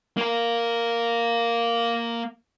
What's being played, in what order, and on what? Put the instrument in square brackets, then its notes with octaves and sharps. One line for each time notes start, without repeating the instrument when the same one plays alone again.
[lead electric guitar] A#3 A#4